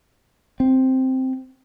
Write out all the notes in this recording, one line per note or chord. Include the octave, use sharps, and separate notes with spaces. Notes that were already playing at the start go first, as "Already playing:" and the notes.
C4